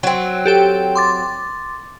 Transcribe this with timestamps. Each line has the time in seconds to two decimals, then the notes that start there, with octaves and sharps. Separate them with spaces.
0.03 F#3 C4
0.45 G4 A4 G5
0.95 C6 D6 A6